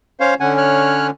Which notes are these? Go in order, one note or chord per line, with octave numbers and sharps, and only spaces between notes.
C#4 C5 C#5 F5
D3 C#4 F#5 G#5
C#5 F6 F#6